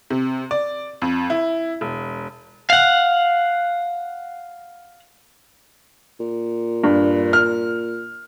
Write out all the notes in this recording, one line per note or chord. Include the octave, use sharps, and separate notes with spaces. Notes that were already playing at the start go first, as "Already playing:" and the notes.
C3
D5
F2
E4
E1
F5 F#5
A#2
G2
F6